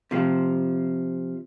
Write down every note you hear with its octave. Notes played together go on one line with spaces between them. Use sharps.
C3 F3